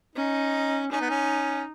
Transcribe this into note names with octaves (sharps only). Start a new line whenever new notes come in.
C#4 D#4
C#4 D#4
B3
C#4